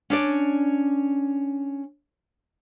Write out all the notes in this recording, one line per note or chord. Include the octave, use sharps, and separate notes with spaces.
C#4 D4 D5